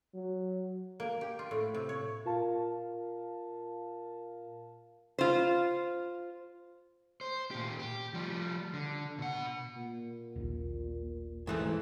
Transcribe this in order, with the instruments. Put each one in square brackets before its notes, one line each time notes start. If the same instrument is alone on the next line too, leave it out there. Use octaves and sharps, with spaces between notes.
[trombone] F#3
[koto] A#3
G4
F4
A2
C3
C#5
[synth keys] A#2 F4 A#4 F5 A5
[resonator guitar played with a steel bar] F4 C5
[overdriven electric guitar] C5
A#2 G4
G4
F3 G3
D3
B2 F#5
[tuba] A#2
[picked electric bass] D#1 A#1
[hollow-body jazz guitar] G#2 E3 A3